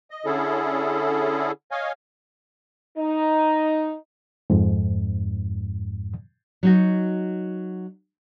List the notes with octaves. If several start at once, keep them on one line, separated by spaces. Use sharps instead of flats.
D#5
D3 C#4 E4 G#4 A4
C#5 D#5 F5 G#5
D#4
F2 G#2
F#3 D#4 F#4